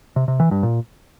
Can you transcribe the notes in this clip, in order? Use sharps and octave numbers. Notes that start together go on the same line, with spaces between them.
C3
C3
E3
G2
A#2